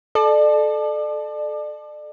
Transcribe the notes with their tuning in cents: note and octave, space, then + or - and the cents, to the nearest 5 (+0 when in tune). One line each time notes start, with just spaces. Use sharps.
A4 -20 D5 +35